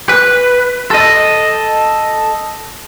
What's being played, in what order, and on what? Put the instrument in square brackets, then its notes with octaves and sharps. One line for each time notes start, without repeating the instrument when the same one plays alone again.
[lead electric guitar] B4
A4 D#5